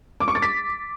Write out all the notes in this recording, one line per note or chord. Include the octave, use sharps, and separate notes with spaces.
D6
C#6
A6
B6